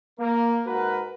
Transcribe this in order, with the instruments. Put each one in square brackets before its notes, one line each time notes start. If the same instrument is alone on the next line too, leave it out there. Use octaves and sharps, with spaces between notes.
[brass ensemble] A#3
G#2 F#4 A#4 B4